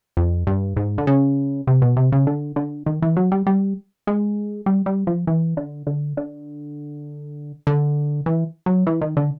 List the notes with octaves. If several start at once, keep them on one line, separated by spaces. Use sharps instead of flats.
F2
G2
G#2
D3
C#3
C3
B2
C3
C#3
D3
D3
D#3
E3
F#3
G3
G3
G#3
G3
G3
F3
E3
D3
D3
D3
D3
E3
F#3
E3
D#3
D3